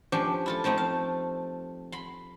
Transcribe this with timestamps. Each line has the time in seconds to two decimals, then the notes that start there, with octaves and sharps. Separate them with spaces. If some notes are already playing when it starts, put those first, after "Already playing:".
0.12 F3 C#4 D4 G4
0.46 E4 F4 A4
0.64 F3 A3 C4 D#4
0.78 F5
1.92 B5 C6